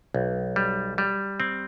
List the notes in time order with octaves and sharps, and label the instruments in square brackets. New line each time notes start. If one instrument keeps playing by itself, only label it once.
[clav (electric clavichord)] B1
G3
G3
C4